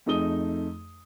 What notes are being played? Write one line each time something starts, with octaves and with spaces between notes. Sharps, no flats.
F2 A3 D#4 G#4 D#6 G7